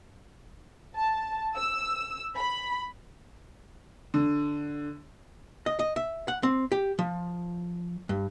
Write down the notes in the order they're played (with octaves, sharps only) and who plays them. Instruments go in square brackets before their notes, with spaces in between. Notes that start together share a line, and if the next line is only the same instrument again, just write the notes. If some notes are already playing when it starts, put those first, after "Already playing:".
[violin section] A5
E6
B5
[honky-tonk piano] D3
[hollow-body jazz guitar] D#5
D#5
E5
F#5
C4
G4
F3
G2